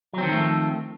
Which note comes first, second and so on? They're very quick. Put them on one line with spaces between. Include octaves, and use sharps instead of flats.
F#3 C4 D#3 F3 A3